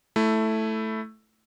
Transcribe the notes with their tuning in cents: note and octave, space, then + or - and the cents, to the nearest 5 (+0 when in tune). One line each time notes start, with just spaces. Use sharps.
A3 +0 E4 +0